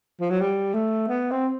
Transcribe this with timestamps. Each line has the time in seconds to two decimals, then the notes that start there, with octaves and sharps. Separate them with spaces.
0.20 F3
0.30 F#3
0.41 G3
0.74 A3
1.08 B3
1.31 C4